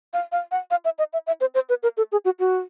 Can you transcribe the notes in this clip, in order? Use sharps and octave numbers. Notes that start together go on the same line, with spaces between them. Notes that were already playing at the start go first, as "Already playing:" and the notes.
F5
F5
F#5
F5
E5
D#5
E5
E5
C5
C5
B4
A#4
A4
G#4
F#4
F#4